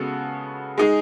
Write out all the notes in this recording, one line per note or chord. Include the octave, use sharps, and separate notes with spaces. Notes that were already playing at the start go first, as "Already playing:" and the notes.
Already playing: C#3 G#3 B3 F#4 A4
G#3 D#4 G#4